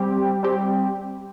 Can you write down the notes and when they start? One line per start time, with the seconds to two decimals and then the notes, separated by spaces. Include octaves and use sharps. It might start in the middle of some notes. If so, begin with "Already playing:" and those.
Already playing: G3 C4 G4
0.43 G3 C4 G4